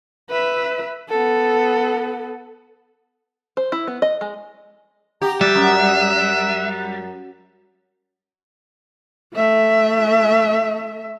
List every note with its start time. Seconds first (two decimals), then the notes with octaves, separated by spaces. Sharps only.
0.30 B4 E5
1.09 B3 A4
3.57 C5
3.72 E4
3.87 B3
4.02 D#5
4.21 G#3
5.22 G4 A#5
5.41 G3 E5 F#6
5.55 F#2
9.34 A3 E5